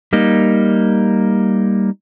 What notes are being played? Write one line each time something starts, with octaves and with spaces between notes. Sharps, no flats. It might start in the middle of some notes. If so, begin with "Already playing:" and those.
G3 A#3 D#4